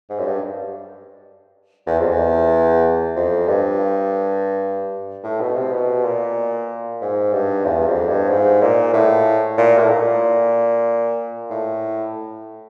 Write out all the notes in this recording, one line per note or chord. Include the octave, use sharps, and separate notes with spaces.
G#2
F#2
G2
E2
F2
E2
F2
G2
A2
B2
C3
B2
A#2
G#2
G2
E2
F2
G2
G#2
A#2
A2
A#2
A2
A#2
A2